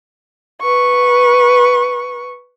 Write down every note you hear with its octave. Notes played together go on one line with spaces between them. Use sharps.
B4 C#6